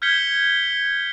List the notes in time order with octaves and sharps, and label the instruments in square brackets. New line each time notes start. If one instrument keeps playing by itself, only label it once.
[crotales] F6 G6 G#6 B6 C#7 G7